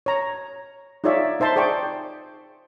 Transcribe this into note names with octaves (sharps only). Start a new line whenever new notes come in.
C#5 A#5
D#4 F4 G#4 C#5 D5 E5
D#4 C5 E5 A5 C6
G#4 C5 D5 G5 C#6